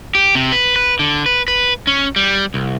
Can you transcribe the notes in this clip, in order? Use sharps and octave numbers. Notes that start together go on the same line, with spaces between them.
G4
C3
B4
B4
D3
B4
B4
C#4
G3
C2